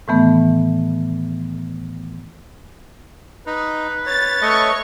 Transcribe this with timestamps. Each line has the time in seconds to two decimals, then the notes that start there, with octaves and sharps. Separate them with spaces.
0.08 A2 D#3 E3 A3 B3
3.47 D#4 B4
4.06 C#5 A6
4.41 A3 C#5 D#5 C#6